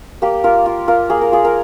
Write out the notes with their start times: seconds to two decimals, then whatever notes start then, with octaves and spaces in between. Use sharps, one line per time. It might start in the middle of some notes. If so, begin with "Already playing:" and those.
0.22 A#3 G4
0.44 F4 A#4
0.66 F4
0.88 F4 A#4
1.10 A#3 G#4
1.21 A#4
1.32 F4 G#4
1.45 A#4